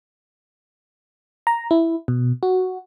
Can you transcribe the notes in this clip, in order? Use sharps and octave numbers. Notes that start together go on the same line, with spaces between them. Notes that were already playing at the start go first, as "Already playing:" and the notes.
A#5
E4
B2
F#4